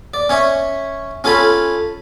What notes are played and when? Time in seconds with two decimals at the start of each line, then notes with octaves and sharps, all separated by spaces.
0.14 D5
0.29 C#4 C#5 E5
1.24 C#4 F4 A4 G#5 B5